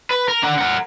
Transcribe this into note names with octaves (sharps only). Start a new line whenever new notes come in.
B4
A#4
D4 F#5
A#4 F#5